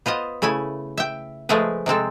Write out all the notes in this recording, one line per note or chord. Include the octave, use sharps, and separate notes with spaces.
B3 F4 C5 D#5
C#3 A3 E4 G#5
E5 G5
F3 G#3 A3 G#4 A#4 B4
C3 G#3 C4 A4